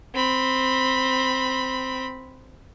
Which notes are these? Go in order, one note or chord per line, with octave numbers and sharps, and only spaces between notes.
C4 B5